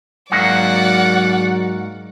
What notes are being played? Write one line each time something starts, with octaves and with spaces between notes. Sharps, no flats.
G#2 F#3 A#3 F#4 D5 F#5